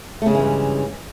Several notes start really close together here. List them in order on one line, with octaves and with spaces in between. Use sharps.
A3 C#3 G#3 E3 G2